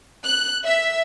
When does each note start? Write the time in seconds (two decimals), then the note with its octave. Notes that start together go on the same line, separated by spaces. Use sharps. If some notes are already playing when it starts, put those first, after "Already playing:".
0.24 F#6
0.65 E5